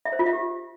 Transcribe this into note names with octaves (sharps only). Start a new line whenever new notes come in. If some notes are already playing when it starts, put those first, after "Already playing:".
E5
C5
F4
E5
G4